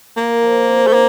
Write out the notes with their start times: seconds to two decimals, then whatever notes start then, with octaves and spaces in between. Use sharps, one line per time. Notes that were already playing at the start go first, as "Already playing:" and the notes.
0.17 A#2 A#3
0.42 F3
0.68 C4
0.87 A3
0.93 A#3 D#4